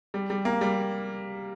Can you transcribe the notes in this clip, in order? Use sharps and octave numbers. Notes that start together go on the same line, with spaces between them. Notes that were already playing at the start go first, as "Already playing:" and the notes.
G3
G3
A#3
G3